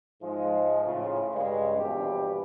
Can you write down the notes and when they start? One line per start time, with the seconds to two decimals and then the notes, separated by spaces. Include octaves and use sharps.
0.21 G#2 F3 G#3
0.84 A2 C#3 F4
1.33 G2 C#3 G#3
1.77 A#1 E2 G2 B2 E3 G4